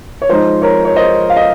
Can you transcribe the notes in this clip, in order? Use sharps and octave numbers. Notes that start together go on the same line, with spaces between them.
C#5
F3 G#3 D#4 C5
A#4 C#5
C#5
C5 D#5
F5
D#5